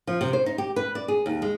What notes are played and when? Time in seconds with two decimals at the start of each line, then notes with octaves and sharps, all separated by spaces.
0.07 F3
0.21 C3
0.33 C5
0.46 D#4
0.58 G4
0.76 B4
0.95 D5
1.08 G#4
1.26 D#2
1.42 G#3